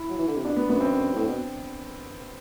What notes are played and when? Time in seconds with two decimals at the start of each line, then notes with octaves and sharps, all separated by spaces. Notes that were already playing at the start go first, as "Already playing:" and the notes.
Already playing: E4
0.10 F#3
0.19 E3
0.27 D3
0.36 C3
0.45 B2 D4
0.56 B3
0.69 F#2 B3
0.80 F#2 C4
1.12 G2
1.16 A2
1.27 B2